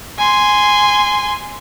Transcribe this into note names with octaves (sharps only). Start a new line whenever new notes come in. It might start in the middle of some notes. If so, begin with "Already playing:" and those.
G#5 C6